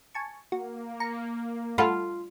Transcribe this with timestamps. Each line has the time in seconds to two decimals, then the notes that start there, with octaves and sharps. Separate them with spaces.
0.15 G#5 A5 C#6
0.52 A#3 F#4
1.00 A#5 C#7
1.78 A3 F4 A4 F#5 B5 C6